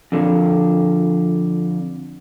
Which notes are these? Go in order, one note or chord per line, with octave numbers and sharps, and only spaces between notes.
F2 D3